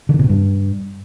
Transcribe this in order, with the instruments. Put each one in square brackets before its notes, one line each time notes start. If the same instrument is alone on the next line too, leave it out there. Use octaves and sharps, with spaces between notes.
[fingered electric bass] D3
D#3
B2
C3
G2